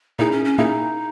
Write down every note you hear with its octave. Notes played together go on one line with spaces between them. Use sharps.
A#2 A#3 D#4 E4 G#4
C#4
C#4
A#2 A#3 D#4 E4 G#4